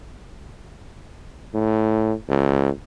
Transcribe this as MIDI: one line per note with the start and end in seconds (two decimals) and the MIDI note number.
1.54 2.13 45
2.29 2.70 37